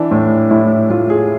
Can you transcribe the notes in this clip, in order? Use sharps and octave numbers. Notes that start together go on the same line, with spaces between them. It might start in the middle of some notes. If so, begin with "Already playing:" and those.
Already playing: E3 D4
A2
A2 E4
A2 F4
G#4